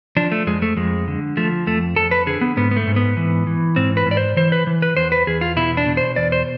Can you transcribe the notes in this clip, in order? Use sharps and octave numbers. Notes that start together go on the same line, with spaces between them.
F3 D4
A3
F2 G#3
A3
F2 G#3
D3
F3 A3
F2 A3
F2 A4
B4
D3 G#4
B3
G#2 B3
B3
A3
G#2
B3
E3
E3
G#2 C4
B4
G#2 D5
C5
E3 C5
B4
E3
B4
E2 C5
B4
E2 G#4
F4
B2 E4
D4
B2
C5
E2 D5
C5